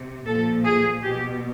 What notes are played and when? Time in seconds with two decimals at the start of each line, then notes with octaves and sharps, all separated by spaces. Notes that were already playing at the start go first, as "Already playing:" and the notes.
Already playing: C3
0.26 A#2 F3 A4
0.65 G#4
1.04 B2 G4